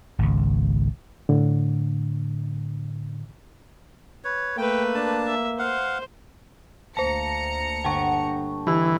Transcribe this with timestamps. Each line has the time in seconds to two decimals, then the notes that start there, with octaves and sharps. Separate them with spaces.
0.19 G#1 C#2
1.29 A2 D3
4.24 B4 C#5
4.58 A3 A#3 B4 G5
4.94 D4 A5
5.27 E5
5.59 C5 F5 F#5
6.97 D2 A#3 C5 A5 A#5 C#7
7.84 G1 F#5 G5 A5 C#6
8.67 D3 E3 G4 E6